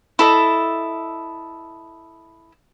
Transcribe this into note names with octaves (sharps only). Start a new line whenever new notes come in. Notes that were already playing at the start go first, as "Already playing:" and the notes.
E4 A4 D#5